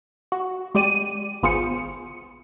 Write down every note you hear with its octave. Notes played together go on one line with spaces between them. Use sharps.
F#4
G#3 G4 D5 D#7
G#1 B3 F4 G#4 C5 C#7